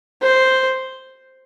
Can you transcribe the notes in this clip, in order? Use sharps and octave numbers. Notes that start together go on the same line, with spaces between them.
C5